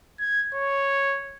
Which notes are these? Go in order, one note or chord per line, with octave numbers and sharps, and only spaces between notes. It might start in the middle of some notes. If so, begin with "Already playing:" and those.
G#6
C#5